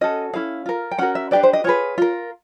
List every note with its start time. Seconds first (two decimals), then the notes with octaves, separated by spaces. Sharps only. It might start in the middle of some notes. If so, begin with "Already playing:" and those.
0.01 C#4 F#4 A4 D#5
0.33 C#4 E4 G#4 F5
0.66 F4 A#4
0.91 G5
0.98 C#4 F#4 A#4 F#5
1.15 E5
1.31 D4 G4 B4 D5
1.43 C5
1.53 D#5
1.64 F4 G#4 B4 C#5
1.98 F4 A#4